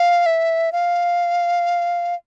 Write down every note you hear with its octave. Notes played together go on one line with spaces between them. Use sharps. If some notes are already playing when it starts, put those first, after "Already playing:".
Already playing: F5
E5
F5